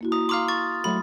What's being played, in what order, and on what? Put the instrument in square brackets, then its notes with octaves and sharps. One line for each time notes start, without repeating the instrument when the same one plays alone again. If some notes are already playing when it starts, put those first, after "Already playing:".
[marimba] A#3 E4 F#4
[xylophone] A#5 [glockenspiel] D#6
[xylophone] F5 A#5 D6 [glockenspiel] C6 F6
[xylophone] C#6 [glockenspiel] A6
[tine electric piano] F#3 A3 F#4 [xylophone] B5